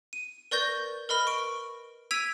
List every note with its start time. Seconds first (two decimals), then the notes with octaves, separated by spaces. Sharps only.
0.13 D#7
0.51 A#4 B4 D5 C#6 G6 A#6
1.09 A#4 B4 D#5 B5 F6
1.27 C#6 D7
2.11 E6 G#6 B6 D7 D#7 F7